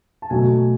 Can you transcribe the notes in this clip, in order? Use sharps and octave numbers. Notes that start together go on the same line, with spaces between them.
A5
B2 F#3 A3 G#5